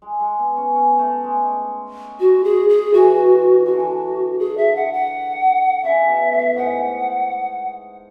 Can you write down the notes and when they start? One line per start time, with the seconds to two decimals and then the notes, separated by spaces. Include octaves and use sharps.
0.02 G#3
0.20 G#3
0.39 B3
0.57 C#4
0.75 C#4
0.99 A3
1.24 G#3
2.20 F#4
2.44 G#4
2.69 G#4
2.93 E3 F#4
3.66 D3 F#4
3.73 E3
3.80 D3
4.39 G#4
4.57 E5
4.76 F#5
4.93 F#5
5.84 C#3 E5
6.08 B2
6.33 A2
6.56 G#2 F#5